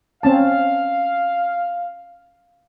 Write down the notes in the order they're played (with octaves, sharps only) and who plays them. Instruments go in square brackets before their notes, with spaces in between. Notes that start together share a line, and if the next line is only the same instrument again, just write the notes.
[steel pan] C4 C#4 A5 [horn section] F5